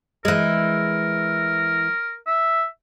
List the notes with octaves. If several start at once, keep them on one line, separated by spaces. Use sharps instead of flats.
E3 G#3 A#4
E5